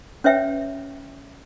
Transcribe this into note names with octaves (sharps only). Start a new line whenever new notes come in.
C#4 B4 C#5 E5 G5